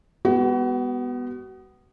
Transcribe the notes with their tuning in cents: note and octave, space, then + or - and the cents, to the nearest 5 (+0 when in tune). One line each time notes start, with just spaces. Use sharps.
G#3 -30 B3 +0 F#4 +35